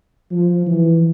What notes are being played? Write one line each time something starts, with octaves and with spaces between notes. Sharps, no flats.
F3
E3